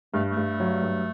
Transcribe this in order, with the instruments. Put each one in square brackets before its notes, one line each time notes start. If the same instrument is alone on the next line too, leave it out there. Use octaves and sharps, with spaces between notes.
[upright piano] G2 [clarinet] A3
[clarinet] A3
[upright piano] G2
F#3
G2